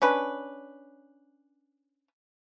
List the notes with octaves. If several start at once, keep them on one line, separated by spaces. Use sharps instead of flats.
C#4 D4 B4